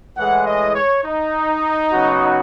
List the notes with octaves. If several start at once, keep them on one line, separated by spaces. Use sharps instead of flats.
A2 E3 G#3 F#5
D#5
C#5
D#4
C#3 F#3 B3 F#4